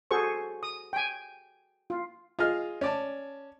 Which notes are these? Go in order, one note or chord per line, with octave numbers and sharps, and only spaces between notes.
F#4 G#4 A4 C5 C#6
D#6
G5 G#5
F4
F4 G#4 D#5 F6
C#4 D5 A5